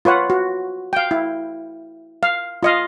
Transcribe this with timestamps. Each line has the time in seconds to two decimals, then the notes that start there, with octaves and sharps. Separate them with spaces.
0.05 F4 B4 C#5 F#5
0.30 F#4
0.93 F5 G5
1.11 E4
2.23 F5
2.63 F4 D#5 F5